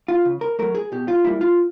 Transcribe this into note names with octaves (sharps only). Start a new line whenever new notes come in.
F4
C#3
A#4
F#3 A3 A#4
G#4
B2 G4
F4
G3 A#3 E4
F4